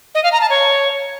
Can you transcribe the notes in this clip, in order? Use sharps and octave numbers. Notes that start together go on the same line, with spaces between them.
D#5
F5
A#5
A5
C#5